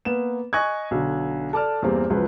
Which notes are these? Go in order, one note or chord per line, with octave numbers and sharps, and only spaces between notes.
A#3 B3 E7
D#5 G#5 C#6 D#6 F#6 G#6
B1 D3
A4 D5 A5 F6
E2 G2 A#3 C4
C#2 F#2 F3 B4